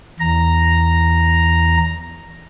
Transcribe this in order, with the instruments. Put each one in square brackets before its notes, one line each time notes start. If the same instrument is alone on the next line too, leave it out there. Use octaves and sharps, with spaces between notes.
[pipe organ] E2 A#5